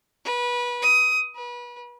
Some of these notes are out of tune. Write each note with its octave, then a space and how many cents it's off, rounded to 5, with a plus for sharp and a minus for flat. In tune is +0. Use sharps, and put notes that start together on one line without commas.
B4 -25
D#6 +20
B4 -30